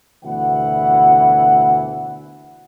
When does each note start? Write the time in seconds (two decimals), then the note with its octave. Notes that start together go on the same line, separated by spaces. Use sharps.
0.25 D2 B2 E3 E4 F#5